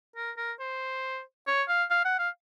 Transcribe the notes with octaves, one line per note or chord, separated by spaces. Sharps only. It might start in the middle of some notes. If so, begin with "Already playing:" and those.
A#4
A#4
C5
C#5
F5
F5
F#5
F5